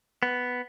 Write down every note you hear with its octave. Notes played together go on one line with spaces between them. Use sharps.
B3